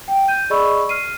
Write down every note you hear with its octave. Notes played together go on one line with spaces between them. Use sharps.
G5
G6 D#7
G#4 D5 D#5 B5 C#6 E6
F6 C7 D#7